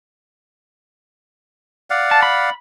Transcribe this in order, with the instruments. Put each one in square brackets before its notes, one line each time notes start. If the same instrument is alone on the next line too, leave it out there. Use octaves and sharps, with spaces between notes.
[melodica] D5 F5 F#5
[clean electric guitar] A5
B5